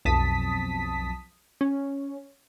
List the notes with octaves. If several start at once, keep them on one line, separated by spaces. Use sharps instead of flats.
B1 F2 A5 D#6 B6
C#4